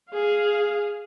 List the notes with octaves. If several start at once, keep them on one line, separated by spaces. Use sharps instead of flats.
G#4 F5